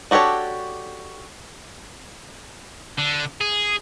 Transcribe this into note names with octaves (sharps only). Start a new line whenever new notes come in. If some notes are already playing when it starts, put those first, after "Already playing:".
D4 F#4 G4 A4 C#5
D3
G#4